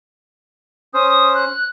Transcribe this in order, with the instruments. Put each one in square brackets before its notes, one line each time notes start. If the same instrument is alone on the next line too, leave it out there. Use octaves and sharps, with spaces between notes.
[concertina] C#4 C5 [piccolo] D#6
[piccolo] F#6